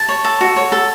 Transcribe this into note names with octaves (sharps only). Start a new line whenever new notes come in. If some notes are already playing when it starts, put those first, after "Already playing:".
Already playing: A5
C#5
A4
F#4
C#5
A4